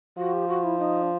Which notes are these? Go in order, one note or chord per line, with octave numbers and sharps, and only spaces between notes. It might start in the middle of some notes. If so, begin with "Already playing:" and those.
F3 F#4
G4
F#4
E4
D#4
D4